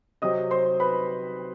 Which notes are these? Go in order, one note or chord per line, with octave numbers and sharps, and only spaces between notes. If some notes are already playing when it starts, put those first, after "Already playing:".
C3 F#3 C4 D#5 D#6
C5 C6
B4 B5